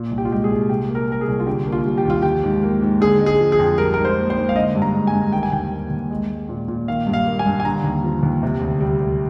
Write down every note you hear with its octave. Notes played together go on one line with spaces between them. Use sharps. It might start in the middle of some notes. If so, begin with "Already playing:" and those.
Already playing: A#2
C2
G4
F4
G#3 G4
G#4
C2
C3 G4
A#3
A#4
G3 A#4
G#4
C2
F4
D3 G4
A#3
F4
G3
G4
D#2 F4
F3 G4
G#2
A#3
G#2
D3 G#4
G#3
G#4
F3
G#4
F2
G3 A#4
G#2 A#4
C5
A#3
C5
G#2
F5
D3 D#5
G2
A#5
G#3
G#5
G2
D#3 G5
G#5
D#2 G5
A#3
D#2
G#3
G#3
A#2
A#2
D#3 F5
G2
F5
A#3
G#5
G2
G#5
D3 A#5
D#2
F3
D#2
C3
D2
G3
D2